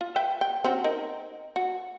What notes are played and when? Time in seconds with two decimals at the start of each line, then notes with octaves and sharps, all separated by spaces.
0.01 F4
0.16 B4 E5 G5
0.41 G5
0.64 C4 C#4 F#4
0.84 D#4 A#4
1.56 F#4